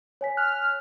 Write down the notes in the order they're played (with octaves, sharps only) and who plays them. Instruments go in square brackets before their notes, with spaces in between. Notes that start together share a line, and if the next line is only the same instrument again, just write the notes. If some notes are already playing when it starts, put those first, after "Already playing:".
[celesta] C#5 G#5 B6
[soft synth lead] F6 [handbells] F#6